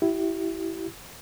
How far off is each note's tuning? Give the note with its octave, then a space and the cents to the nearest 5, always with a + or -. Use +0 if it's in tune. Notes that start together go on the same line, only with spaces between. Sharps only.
E4 +0 G4 -35